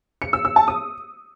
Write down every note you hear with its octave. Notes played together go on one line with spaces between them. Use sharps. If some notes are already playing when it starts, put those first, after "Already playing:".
C#7
E6
E6
A5
D#6